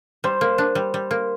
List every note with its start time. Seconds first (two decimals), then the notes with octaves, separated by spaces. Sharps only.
0.24 G3 C5
0.41 A#3
0.58 D4
0.75 G3
0.94 G3
1.11 A#3